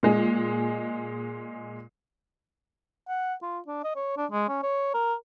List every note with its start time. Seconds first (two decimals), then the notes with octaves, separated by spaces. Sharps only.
0.03 A#2 G#3
3.08 F#5
3.42 F4
3.67 D4
3.84 D#5
3.95 C#5
4.17 D4
4.31 G#3
4.49 C#4
4.63 C#5
4.94 A#4